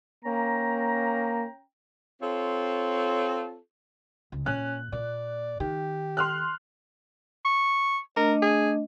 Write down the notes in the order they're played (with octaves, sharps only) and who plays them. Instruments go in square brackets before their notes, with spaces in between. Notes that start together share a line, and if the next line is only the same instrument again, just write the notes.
[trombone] A#3 [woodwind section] C#4 G5 A#5
[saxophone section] C4 F4 A4 C#5
[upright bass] C#2
[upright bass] A#2 [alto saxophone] C#4 [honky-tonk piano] F#6
[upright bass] A#2 [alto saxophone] D5
[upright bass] D#3 [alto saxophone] G4
[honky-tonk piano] C6 F6 F#6
[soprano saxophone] C#6
[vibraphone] A3 D4 D#5 [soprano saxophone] A#4
[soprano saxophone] G#4